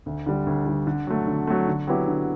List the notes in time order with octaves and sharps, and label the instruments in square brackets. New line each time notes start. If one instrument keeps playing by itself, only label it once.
[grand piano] D2
D3 G3
D2
D3 G3
D3
F#3 A3
D3
F#3 A3
D3
F#3 B3 E4 G4
D3